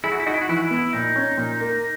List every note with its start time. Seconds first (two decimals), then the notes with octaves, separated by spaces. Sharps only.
0.04 E4 G#4
0.12 F#4
0.20 E4
0.26 D#4 F#4
0.34 E4
0.41 F#4
0.49 E3 E4
0.57 F#4
0.63 E4
0.71 B3
0.93 A#2 D#4
1.16 C#4
1.38 A#2
1.61 A#3